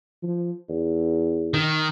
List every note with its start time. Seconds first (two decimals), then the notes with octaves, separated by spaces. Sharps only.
0.23 F3
0.69 E2
1.54 D#3